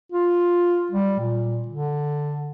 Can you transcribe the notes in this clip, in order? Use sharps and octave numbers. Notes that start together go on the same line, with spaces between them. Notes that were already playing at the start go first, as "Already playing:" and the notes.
F4
G3
A#2
D3